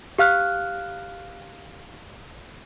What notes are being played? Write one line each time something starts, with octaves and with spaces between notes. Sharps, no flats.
G4 F5 F6 F#6